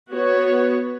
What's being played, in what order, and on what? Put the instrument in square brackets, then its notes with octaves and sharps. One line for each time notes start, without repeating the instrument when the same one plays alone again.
[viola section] B3 F#4 C#5